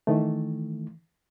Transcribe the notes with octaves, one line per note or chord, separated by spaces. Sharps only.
D#3 E3 A3